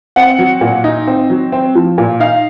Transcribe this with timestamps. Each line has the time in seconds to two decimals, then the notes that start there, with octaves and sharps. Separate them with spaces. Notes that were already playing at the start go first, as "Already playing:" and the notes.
0.16 C4 F#5
0.39 F#3
0.61 A#2
0.84 D#4
1.07 C4
1.30 F#3
1.52 C4
1.75 F3
1.98 A#2
2.20 D#4 F5